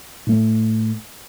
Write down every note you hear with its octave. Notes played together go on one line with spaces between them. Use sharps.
A2 A3